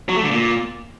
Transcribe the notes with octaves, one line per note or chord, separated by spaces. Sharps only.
F#3
A3
D3
A#2